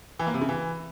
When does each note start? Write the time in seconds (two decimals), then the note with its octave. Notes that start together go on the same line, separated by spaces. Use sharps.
0.19 E3
0.27 A#3
0.34 C3
0.41 C#3
0.49 E3